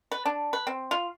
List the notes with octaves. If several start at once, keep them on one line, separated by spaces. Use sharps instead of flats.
B4
D4
B4
C4
F4